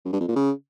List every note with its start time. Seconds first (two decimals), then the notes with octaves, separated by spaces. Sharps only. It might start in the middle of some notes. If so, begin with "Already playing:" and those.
0.05 F#2
0.13 G2
0.20 F2
0.28 A#2
0.36 C#3